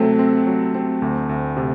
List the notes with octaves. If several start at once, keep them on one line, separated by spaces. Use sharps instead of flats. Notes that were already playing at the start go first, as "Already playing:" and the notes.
Already playing: C3 F#3 A3 C4
C4
F#3
C4
D2
D2
C3